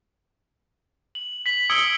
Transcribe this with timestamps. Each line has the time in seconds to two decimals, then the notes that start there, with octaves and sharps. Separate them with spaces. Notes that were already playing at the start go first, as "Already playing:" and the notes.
1.15 F#7
1.46 B6 F#7
1.70 D#6 E6 G#6 C#7 D7 G7